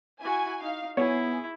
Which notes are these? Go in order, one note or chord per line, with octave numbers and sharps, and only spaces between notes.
E4 F#4 G#5
D#4 F5
B3 E4 G#4 C#5